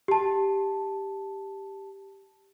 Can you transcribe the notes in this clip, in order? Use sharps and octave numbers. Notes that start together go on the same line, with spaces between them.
G4 A5